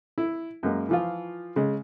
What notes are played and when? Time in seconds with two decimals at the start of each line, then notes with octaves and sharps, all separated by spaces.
0.18 E4
0.63 F#2 G#3 A#3
0.89 E3 F3 F4
1.56 C#3 G#3